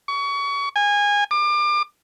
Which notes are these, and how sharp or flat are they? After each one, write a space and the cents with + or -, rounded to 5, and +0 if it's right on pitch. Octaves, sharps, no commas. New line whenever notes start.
C#6 +30
G#5 -20
D6 +30